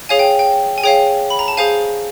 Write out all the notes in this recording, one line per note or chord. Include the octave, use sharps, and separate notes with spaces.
G#4 C#5 F5 G#5
G5
G5
G#5
G#4 C#5 F5 G5
B5
A#5
A5
G#4 C5 F5 G#5